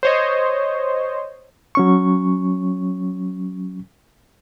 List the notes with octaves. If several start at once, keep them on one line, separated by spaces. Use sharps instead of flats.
C5 C#5 D#5
F#3 C#4 C#6